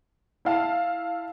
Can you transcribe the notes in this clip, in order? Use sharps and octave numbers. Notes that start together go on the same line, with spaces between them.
E4 F5 A5